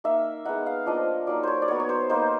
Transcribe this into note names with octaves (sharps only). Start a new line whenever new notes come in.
A#3 D#4 E5
G#3 B3 D#4 F#5
F5
F3 A#3 D4 F4 D#5
F#3 A#3 D#4 D5
C5 C#5
D5
F#3 B3 D#4 C#5
C#5
C5
F#3 A#3 D#4 C5